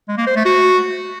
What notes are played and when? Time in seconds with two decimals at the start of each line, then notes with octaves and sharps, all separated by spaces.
0.08 G#3
0.18 A#3
0.27 C5
0.36 A3
0.45 F#4